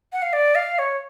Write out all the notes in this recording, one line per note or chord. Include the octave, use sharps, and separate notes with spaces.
F#5
F5
D5
F5
C#5